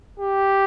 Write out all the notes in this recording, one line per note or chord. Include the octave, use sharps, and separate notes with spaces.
G4